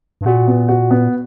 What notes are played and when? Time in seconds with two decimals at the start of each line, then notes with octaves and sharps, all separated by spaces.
0.21 G2
0.25 A#2 F#4
0.48 B3
0.68 F#4
0.91 B3